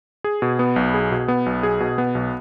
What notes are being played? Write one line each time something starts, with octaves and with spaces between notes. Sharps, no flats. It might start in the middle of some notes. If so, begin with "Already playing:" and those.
G#4
B2
B3
B1
G#4
B2
B3
B1
G#4
B2
B3
B1